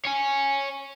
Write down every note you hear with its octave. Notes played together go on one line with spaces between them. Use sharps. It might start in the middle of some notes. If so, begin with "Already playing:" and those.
C#5 G#5